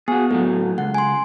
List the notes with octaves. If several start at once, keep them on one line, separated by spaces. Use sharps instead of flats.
B3 F#4 G#4
A2 F#3 A4
C#2 F#5
G#5 C6